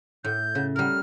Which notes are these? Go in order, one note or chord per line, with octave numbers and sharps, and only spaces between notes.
A2 G6
C#3
G3 A#4 F6